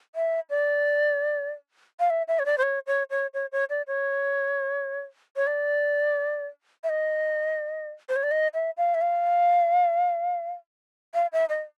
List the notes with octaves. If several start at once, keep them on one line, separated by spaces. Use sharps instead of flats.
E5
D5
F5
E5
E5
C#5
D5
C5
C#5
C#5
C#5
C#5
C#5
D5
C#5
C#5
D5
E5
D#5
C5
C#5
D5
D#5
E5
F5
E5
F5
F5
E5
D#5